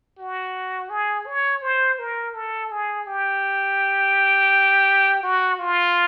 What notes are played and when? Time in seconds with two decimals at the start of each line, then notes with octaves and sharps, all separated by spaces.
0.19 F#4
0.90 G#4
1.27 C#5
1.62 C5
1.99 A#4
2.34 A4
2.71 G#4
3.07 G4
5.23 F#4
5.59 F4